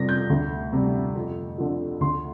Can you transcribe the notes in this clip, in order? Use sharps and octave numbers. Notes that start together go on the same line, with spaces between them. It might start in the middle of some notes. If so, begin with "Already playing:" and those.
Already playing: F2 C3 G3 A#6
G6
D2
C3 G3
F2
D3 F3
D2 C6